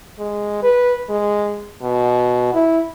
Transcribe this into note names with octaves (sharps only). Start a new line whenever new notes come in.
G#3
B4
G#3
B2
E4